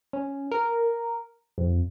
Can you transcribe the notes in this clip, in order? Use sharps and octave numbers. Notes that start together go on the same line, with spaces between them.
C#4
A#4
F2